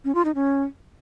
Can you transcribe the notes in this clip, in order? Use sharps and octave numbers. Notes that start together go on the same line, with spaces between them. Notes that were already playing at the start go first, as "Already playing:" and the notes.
C#4
F4
D#4
C#4